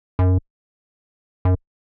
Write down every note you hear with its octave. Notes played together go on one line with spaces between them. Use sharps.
F#2
F#2